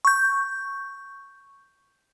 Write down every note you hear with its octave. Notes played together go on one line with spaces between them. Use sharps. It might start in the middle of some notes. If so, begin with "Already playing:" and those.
C#6 G6